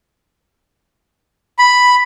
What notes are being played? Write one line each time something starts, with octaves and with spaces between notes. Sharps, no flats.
B5